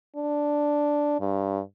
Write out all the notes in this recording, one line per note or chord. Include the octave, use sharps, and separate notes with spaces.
D4
G2